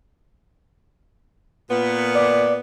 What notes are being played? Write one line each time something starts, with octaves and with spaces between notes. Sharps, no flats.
A#2 B3
D5